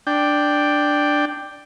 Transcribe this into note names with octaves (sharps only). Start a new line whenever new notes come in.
D4 G5